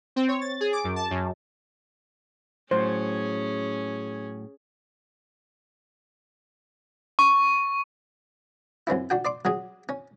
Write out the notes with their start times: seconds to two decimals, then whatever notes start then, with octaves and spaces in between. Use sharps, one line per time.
0.16 C4
0.28 C#5
0.41 A6
0.61 G#4
0.73 D6
0.84 F#2
0.96 A5
1.11 F#2
2.71 A2 F#3 C#4 G#4 C5
7.19 C#6
8.87 F#2 C4 C#4 E4
9.10 D4 F#4 G5
9.25 D5 C6 D6
9.45 F#3 C#4 G#4
9.89 C#4